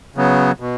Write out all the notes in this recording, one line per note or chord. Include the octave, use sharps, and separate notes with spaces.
C#3 F#3 B3
B2